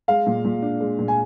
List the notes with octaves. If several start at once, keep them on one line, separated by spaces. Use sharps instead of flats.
G#3 F5
A#2
A#2
D4
G#3
A#2
G#5